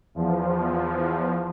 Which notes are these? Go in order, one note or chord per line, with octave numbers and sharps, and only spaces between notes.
E2 F3